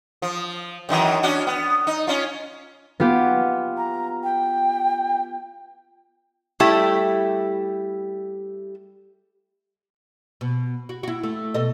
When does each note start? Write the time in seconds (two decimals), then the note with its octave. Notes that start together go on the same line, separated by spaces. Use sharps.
0.22 F3
0.89 F#2 D#3 E3
1.23 C#4 D4 F#4
1.47 B3
1.87 D#4
2.07 C#4 F4
3.00 B3 F4 G4
3.77 A#5
4.23 G5
6.60 G3 A3 E4 G4
10.41 B2
10.89 F#4
11.03 E4 F#4
11.23 A3
11.54 B2 A4 D#5